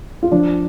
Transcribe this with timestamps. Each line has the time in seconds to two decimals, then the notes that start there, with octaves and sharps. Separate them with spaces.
0.23 F4
0.31 F3 D4